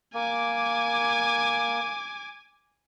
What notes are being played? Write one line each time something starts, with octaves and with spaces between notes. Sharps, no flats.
A#3 G#5 D6